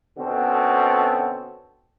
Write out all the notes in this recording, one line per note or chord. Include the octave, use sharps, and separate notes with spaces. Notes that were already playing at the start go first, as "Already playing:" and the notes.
B2 D3 C4 C#4 F#4 A4